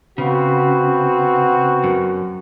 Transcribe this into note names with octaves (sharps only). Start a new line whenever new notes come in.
C#3 B3 C4 F#4
F#2